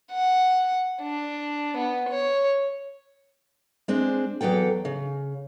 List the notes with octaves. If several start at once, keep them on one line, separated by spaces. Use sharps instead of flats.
F#5
D4
B3
C#5
G#3 C4 D4
E2 E3 F#3 A4 G5
C#3